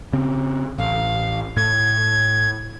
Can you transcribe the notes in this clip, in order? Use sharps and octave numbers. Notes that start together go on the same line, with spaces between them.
C#3 C4
A1 F5
A2 G#6